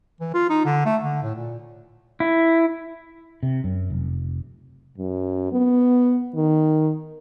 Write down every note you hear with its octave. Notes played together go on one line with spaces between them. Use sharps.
E3
F4
D#4
D3
A3
D3
A2
A#2
E4
C3
F#2
F1
F#2
B3
D#3